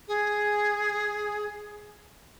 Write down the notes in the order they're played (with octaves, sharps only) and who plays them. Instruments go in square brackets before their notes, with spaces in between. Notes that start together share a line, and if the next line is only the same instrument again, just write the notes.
[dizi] G#4